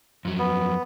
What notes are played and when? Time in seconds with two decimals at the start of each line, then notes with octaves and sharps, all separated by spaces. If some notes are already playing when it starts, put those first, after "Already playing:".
0.25 F2 F#3
0.39 B3